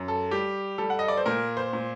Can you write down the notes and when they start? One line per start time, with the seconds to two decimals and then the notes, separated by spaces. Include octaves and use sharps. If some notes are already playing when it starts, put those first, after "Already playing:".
Already playing: F#2
0.08 A4
0.31 G3 G4
0.78 G3 A4
0.90 F#5
0.99 D#5
1.08 D5
1.17 C5
1.26 A#2 A#4
1.57 C5
1.73 A#2